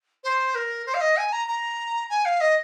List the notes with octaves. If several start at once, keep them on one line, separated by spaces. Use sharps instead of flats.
C5
A#4
C5
F5
D#5
G#5
A#5
A#5
G#5
F5
D#5